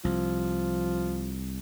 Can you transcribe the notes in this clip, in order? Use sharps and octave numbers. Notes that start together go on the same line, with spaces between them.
C2 F3